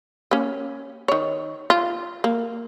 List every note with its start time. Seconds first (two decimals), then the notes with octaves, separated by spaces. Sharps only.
0.31 A#3 C#4
1.08 D#3 C#5
1.70 F4
2.24 A#3